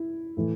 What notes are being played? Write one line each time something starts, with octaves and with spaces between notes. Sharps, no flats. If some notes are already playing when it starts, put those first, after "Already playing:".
Already playing: E4
A2 E3